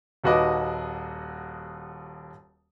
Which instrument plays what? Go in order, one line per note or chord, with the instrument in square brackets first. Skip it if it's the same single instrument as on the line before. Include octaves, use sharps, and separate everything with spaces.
[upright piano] D#1 D#2 F#4 B4 D#5 D6